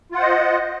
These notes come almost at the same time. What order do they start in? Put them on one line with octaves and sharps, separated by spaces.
F4 F#5 C5 D#5